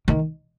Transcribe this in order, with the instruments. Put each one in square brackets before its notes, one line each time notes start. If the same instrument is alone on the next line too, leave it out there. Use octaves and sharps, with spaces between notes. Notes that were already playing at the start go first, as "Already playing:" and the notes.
[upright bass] D#3